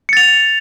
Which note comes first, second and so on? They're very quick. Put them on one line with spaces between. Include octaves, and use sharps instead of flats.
C#7 A6 F7